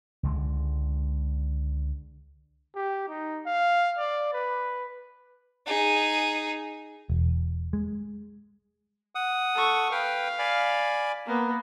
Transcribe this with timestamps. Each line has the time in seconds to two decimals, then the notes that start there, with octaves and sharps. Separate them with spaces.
0.23 C#2 D3 G#3
2.75 G4
3.08 D#4
3.46 F5
3.98 D5
4.33 B4
5.66 D#4 G#4
7.10 E1
7.73 G#3
9.15 F#5 D#6
9.54 A4 C#6
9.92 B4 F5 G5
10.39 D5 G#5 B5
11.26 A#3 B3